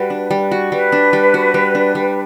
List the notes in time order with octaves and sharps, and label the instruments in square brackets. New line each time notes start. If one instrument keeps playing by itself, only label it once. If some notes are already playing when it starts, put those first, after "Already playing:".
Already playing: [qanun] G3 F#4 [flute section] B4
[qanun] D4
G3
F#4
[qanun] G3 [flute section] B4
[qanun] D4
G3
F#4
G3
D4
G3